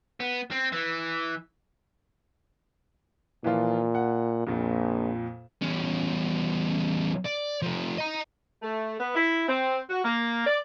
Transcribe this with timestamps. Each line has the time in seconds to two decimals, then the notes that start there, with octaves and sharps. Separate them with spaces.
0.20 B3
0.52 C4
0.73 E3
3.44 A#2 E3 F3 F4
3.95 F#5
4.47 A#1 F2 A#2
5.62 E2 C#4
7.26 D5
7.62 F3 A3
7.98 D#5 A#5
8.62 A3
9.00 B3
9.15 E4
9.48 C4
9.89 F#4
10.04 A#3
10.46 D5